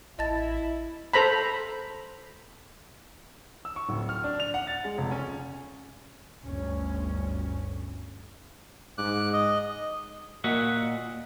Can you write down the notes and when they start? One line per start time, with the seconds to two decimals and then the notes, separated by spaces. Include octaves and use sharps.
0.19 A1 E4 D#5 A5 A6
1.13 A4 C5 A#5 B5
3.65 E6
3.76 C#6
3.89 D1
4.09 F6
4.24 D4
4.40 F7
4.54 F#5
4.67 A6
4.84 G#3
4.98 F1
5.11 C#4
6.44 G1 D2 C#4
8.98 G#2 D6 F#6
9.33 D#5
10.44 A#2 A#3 F#4 D#5 E5 F#5